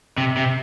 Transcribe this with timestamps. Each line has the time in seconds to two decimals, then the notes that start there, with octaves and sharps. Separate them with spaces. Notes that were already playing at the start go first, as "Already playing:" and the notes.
0.18 C3
0.37 C3